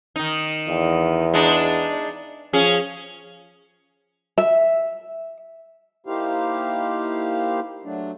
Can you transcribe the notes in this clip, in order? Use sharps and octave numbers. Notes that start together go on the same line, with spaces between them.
D#3 D#4
E2
G#3 D4 D#4
F3 C#4 G#4
E5
A#3 D#4 E4 G4 C5 F5
F#3 A3 D4